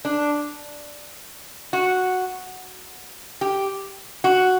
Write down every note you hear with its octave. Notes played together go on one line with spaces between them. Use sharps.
D4
F#4
G4
F#4